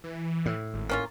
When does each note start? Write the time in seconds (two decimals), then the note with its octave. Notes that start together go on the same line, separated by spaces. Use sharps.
0.04 E3
0.46 A2
0.74 G#1
0.90 A#3 C#4 F4